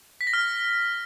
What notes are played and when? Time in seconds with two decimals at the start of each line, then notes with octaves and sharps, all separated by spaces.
0.21 B6
0.27 A#6
0.33 F6